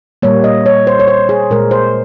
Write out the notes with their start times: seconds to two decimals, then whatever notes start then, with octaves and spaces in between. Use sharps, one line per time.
0.22 A#2 G3 A#3 C#5
0.44 D#5
0.66 C#5
0.87 C5
1.00 C#5
1.08 C5
1.29 G#4
1.51 A#2 G#3 A#4
1.71 C5